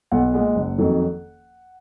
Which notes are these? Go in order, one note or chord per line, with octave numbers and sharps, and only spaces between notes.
B1 F#5
A#2 G#3
F#1
F2 D#3 F#3